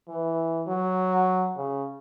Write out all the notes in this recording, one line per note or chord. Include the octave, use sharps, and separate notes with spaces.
E3
F#3
C#3